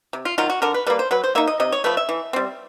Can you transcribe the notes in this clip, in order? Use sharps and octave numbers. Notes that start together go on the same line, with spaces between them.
C3
F4
D#3 F#3 F4
F#4
D3 A#4
B4
G3 A#3 B4
C5
F#3 B4
C5
A#3 D#4 E5
D#5
C3 D#5
C#5
F3 A3 B4
E5
E3
G3 C4